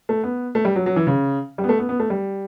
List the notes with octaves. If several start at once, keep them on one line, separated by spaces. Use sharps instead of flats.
A3
B3
A3
G3
F#3
F#3
E3
C#3
G3
B3
A3
B3
B3
A3
G3